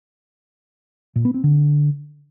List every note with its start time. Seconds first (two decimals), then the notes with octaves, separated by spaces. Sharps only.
1.16 A#2
1.25 B3
1.34 C4
1.44 D3